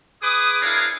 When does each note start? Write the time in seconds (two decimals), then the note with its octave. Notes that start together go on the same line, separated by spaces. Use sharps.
0.22 G#4 B4 D6 D#6
0.62 D4 E4 G#4 A#4 C#5 F5